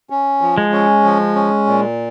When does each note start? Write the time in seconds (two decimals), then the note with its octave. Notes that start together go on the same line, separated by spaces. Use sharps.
0.10 C#4
0.41 F3
0.58 G#3
0.73 C#4
1.04 F3
1.35 C#4
1.67 A#2